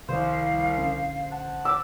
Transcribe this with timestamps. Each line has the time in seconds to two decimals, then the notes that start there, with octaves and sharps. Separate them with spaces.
0.09 C2 C3 D#3 F3 C5 F5
0.78 A#1 D3 C#4
1.32 F#5 A5
1.65 D6 E6